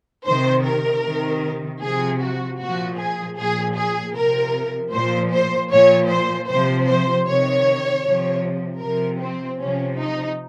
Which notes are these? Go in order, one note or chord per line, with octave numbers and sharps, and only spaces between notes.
C3 D#3 C5
A#4
C3 D#3
C3 F3 G#4
F#4
A#2 F3 F#4
G#4
A#2 F3 G#4
G#4
C3 F3 A#4
A#2 F3 C5
C5
A#2 F3 C#5
C5
C3 F3 C5
C5
C3 D#3 C#5
C3 F3
C3 F3 A#4
C4
C3 F3 C#4
D#4